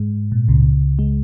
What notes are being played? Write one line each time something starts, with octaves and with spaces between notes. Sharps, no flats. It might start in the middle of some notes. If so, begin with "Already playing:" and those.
Already playing: G#2 G#3
A#2
C#2 C#3
G#3